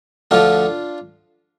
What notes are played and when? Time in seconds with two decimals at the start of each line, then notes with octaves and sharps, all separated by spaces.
0.31 D2 D3 F3 D4 F4